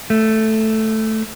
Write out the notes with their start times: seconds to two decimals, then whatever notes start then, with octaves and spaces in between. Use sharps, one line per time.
0.10 A3